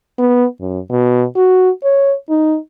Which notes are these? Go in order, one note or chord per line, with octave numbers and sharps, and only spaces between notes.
B3
F#2
B2
F#4
C#5
D#4